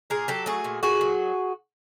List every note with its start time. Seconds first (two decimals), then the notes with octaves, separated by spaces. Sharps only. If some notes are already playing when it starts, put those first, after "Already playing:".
0.10 A#2 G#4 A#4
0.28 F#3 G4 A4
0.46 A3 F#4 G#4
0.64 A#2
0.83 A#2 F#4 G#4
1.01 F#3